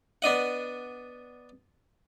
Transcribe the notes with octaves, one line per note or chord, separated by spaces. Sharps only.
B3 D4 D#5 F#5